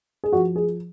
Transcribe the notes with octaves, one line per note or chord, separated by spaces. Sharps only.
G#4
F3 F#4
G#4